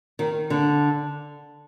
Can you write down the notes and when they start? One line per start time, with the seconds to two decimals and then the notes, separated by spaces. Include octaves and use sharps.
0.19 D#3
0.50 D3